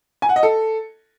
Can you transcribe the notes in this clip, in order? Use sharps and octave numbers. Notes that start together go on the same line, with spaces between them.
G#5
F#5
D#5
A4